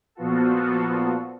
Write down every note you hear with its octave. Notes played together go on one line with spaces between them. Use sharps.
A#2 F3 B3 F4 F#4 A4